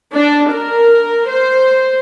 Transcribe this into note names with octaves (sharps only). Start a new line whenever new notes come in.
D4
A#4
C5